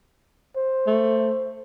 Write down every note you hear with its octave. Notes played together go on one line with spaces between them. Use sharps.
C5
A3